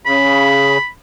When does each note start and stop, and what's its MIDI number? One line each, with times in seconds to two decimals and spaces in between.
0.06 0.78 49
0.06 0.88 83